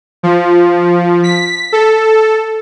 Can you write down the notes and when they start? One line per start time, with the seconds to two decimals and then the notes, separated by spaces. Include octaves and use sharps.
0.23 F3
1.24 B6
1.72 A4